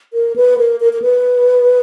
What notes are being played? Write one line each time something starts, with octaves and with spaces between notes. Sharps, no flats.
A#4
B4
A#4
A#4
A#4
B4